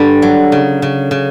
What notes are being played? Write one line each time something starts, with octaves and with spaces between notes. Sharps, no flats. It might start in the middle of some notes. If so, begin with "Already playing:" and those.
Already playing: G2 D3 G3
F#3
C#3
C#3
C#3